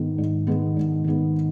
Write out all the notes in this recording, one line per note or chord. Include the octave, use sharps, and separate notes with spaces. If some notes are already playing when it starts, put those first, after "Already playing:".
Already playing: G#2 D#3 G#3 B3
G#2
D#3 G#3 B3
G#2
D#3 G#3 B3